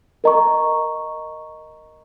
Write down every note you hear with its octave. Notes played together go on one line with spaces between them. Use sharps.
A#4 D#5 A#5 C#6